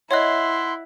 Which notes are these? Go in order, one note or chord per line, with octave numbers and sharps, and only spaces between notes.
E4 C#5 D#5 E5 F#5 C6 F#6